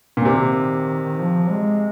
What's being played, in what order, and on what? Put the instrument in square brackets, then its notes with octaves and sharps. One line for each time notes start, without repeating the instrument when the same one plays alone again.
[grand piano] A#2
[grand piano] C3 [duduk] D#3
[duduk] F3
G#3